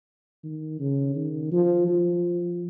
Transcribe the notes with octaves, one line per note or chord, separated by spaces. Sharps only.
D#3
C#3
D#3
F3
F3